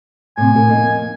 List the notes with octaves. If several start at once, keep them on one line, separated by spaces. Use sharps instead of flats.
A2 C3 G#5
A2 A4 A#4
F2 A#3 D#4